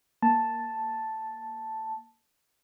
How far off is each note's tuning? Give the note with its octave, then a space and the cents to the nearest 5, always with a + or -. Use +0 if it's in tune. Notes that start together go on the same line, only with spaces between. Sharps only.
A#3 +0 A5 +0